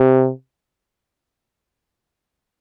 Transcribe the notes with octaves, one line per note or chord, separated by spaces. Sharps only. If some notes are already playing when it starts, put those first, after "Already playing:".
Already playing: C3